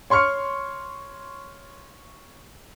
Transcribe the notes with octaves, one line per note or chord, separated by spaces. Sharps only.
C#5 C6 C#6 F6 C#7